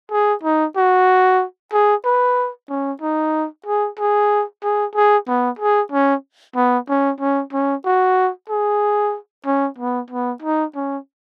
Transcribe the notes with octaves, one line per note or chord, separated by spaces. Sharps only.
G#4
D#4
F#4
G#4
B4
C#4
D#4
G#4
G#4
G#4
G#4
B3
G#4
C#4
B3
C#4
C#4
C#4
F#4
G#4
C#4
B3
B3
D#4
C#4